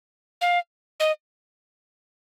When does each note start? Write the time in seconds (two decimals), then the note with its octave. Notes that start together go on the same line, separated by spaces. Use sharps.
0.41 F5
1.00 D#5